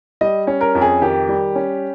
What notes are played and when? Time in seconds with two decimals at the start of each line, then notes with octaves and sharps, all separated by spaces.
0.21 G3 D#5
0.47 C#4
0.61 A#4
0.75 F2
0.82 G#4
1.01 D#3 G4
1.29 G3
1.55 C#4